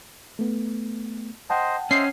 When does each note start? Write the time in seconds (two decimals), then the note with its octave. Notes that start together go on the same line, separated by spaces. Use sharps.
0.39 A3 B3
1.50 C5 D#5 F#5 G5 A5
1.91 C#4 C5 D#5 E5 C7